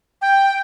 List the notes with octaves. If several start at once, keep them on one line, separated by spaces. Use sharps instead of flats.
G5